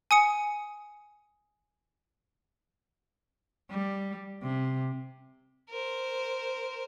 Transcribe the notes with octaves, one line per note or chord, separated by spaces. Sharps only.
G#5 D#6 C#7
G3
C3
A#4 C5